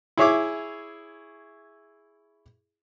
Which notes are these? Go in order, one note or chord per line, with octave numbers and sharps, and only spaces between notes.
E4 G#4 C#5 E5 D6